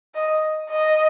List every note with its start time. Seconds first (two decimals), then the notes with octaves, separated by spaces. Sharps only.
0.15 D#5
0.70 D#5